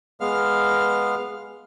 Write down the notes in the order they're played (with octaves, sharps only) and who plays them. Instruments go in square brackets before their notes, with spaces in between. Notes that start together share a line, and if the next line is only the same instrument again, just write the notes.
[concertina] G#3 B3 F5 F6